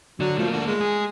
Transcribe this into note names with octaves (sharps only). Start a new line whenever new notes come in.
D3 F#3 D4
F3 A3 A#3
D3
G#3
G#4